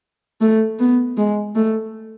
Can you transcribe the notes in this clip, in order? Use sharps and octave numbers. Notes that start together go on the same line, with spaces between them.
A3
B3
G#3
A3